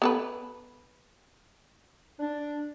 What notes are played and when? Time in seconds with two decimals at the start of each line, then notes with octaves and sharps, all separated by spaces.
0.02 B3 A4 B4
2.19 D4